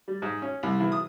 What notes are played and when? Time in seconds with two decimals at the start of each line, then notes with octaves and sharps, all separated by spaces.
0.08 G3
0.22 G#2
0.42 C#4
0.63 C2
0.80 E2
0.92 D#6